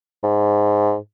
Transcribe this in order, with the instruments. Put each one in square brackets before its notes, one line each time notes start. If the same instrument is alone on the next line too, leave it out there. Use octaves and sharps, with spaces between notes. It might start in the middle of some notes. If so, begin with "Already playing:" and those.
[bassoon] G#2